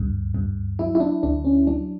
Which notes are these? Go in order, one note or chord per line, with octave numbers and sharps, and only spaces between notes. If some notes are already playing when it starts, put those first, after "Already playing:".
Already playing: D2 G2
G2
F#3 E4
E4
D4
D2 D4
C#4
F#3 D4